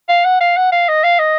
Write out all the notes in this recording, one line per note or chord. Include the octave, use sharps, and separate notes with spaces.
F5
F#5
F5
F#5
F5
D#5
F5
D#5